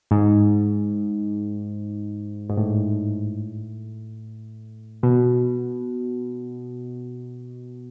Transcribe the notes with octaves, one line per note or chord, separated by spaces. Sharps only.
G#2
G#2
A2
B2